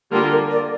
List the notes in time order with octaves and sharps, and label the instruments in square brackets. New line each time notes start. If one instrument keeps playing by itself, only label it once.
[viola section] D3 G3 A#3 F4 A#4 [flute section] G4
[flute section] A#4
A#4 D5